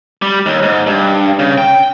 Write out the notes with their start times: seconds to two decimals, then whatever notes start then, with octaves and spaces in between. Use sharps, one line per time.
0.22 G3
0.46 D#2
0.63 G#2
0.87 G2
1.39 C#3
1.58 G5